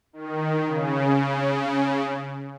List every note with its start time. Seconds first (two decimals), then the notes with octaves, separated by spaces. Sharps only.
0.13 D#3
0.66 C#3